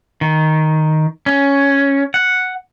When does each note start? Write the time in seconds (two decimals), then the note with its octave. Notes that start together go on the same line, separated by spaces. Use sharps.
0.21 D#3
1.26 C#4
2.14 F#5